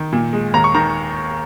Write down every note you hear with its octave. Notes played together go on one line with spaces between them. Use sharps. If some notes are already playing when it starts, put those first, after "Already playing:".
Already playing: D#3
A#2
G#3
D#2 A#5
C#6
D#3 A#5